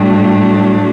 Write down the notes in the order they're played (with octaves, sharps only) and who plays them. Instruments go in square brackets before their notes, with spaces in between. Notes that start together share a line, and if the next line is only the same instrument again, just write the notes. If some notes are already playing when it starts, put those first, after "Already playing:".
Already playing: [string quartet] A2 F#3 A3 D4 [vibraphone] G3